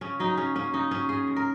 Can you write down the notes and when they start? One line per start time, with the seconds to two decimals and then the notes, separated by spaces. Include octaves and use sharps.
0.01 C#3 C#4
0.19 F#3 D#4
0.37 C#3 C#4
0.55 A#3 C#4
0.73 C#3 D#4
0.91 F#3 C#4
1.09 C#3 G#4
1.27 G#3
1.36 A#4